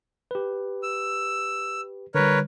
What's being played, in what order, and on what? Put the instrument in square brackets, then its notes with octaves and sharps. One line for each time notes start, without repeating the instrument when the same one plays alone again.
[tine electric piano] G4 B4
[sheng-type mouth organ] E6
[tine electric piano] D3 G3 [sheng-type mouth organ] A#4 B4 C#5